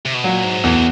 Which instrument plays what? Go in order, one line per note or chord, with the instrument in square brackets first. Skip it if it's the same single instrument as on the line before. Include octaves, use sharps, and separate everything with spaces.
[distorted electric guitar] C3
B2
[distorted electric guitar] A#2 [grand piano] F#3
[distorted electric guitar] G#2
[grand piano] E2 [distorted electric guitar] A2